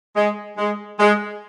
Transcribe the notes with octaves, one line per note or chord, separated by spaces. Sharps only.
G#3
G#3
G#3